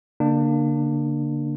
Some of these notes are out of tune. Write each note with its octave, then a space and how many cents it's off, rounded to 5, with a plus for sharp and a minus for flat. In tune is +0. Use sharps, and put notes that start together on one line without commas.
D3 -45 A#3 +0 D4 +25